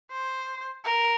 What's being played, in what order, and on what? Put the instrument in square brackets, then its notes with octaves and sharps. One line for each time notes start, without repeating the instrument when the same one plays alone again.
[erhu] C5
A#4